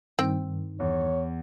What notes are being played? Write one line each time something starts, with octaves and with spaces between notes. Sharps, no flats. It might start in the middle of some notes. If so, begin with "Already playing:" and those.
G2 D#3 C4 G5
E2 C#5